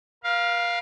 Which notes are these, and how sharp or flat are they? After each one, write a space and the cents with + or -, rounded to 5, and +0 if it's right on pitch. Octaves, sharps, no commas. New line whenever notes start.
A#4 +45 F5 +0